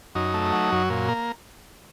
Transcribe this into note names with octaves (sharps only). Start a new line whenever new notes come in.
F#2 D#4
A3
F#3
F#2
A#2
A#3